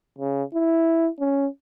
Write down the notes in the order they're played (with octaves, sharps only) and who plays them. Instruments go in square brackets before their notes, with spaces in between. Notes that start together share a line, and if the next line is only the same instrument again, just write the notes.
[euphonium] C#3
E4
C#4